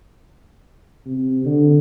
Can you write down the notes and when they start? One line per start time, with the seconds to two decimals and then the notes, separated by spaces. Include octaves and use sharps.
1.06 C3
1.45 D3